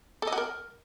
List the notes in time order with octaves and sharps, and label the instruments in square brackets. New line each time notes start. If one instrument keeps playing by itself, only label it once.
[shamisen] A4
D#5
F#4
A#4